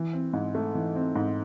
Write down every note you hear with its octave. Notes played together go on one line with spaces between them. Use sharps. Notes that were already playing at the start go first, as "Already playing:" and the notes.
Already playing: E3
C4
G#2
A3
E3
C4
G#2